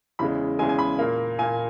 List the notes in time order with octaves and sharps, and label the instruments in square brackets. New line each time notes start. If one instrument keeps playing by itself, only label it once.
[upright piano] E2 C#3 G#3 B5
G#3 G#5
E2 C#3
G#5
B5
A#2 A#3
A#2 G#5
A#3